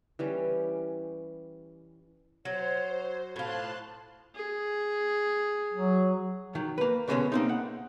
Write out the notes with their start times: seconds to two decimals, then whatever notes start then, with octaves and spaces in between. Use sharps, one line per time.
0.19 E3 G3 C#4
2.45 F#3 C5 C#5
3.36 A2 F4 C5 A5 C6 F#6
4.35 G#4
5.74 F#3
6.55 D#3 F#3
6.78 A#3 B4
7.08 B2 D3 G3 G#3 B3 C#4
7.32 A#3 C4 D#4
7.49 F#5